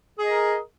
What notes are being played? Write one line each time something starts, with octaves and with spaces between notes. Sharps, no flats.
G#4 A#4 D#5